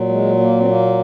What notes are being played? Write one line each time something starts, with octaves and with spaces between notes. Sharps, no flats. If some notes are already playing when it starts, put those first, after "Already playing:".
Already playing: A#2 F#3
G#3
A#3
C4
A#3